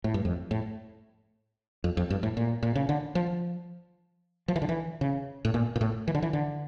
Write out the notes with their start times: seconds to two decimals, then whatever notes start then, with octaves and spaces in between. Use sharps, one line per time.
0.04 A2
0.14 G2
0.25 F2
0.51 A2
1.84 F2
1.97 F2
2.10 G2
2.23 A2
2.37 A#2
2.63 A#2
2.75 C#3
2.89 D3
3.15 F3
4.48 F3
4.56 E3
4.62 D3
4.69 E3
5.01 C#3
5.45 A2
5.54 A#2
5.76 A#2
5.81 A2
6.08 E3
6.15 D3
6.22 E3
6.33 D3